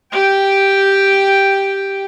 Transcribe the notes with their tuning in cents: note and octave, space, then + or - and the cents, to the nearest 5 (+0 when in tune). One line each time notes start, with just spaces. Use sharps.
G4 +0 G5 +0